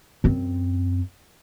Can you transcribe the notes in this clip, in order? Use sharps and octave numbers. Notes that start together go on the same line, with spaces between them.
F#2 C4